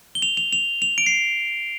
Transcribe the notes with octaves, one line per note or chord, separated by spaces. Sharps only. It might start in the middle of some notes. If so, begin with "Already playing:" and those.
G7
F7
F7
F7
F7
D7
C7